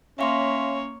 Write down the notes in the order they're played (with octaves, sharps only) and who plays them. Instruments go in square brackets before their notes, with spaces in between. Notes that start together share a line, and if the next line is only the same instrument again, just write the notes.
[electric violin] A#3 C#5 [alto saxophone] C#4 [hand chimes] E5 F5 C6